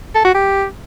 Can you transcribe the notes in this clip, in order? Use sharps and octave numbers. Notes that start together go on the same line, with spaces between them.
A4
F#4
G4